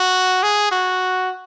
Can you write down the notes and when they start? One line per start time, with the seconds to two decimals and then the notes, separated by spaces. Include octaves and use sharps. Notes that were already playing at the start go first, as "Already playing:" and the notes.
Already playing: F#4
0.43 G#4
0.71 F#4